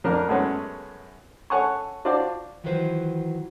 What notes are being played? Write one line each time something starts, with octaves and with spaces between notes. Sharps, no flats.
F2 D4 A#4
F#2 G#3 A3 B3 C#4
A4 C#5 F#5 G#5 C#6
D4 F4 F#4 C5 D5
D#3 E3 F#3 F4 B4 C5